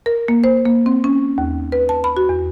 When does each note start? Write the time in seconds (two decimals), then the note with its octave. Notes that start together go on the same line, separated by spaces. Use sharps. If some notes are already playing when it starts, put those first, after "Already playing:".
0.06 A#4
0.28 A#3
0.44 C5
0.66 A#3
0.86 C4
1.04 C#4
1.38 D#2
1.72 B4
1.89 A5
2.04 B5
2.17 F#4
2.29 E2